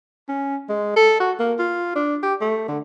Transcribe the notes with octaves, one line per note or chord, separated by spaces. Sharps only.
C#4
G#3
A4
F#4
A#3
F4
D4
G4
A3
D3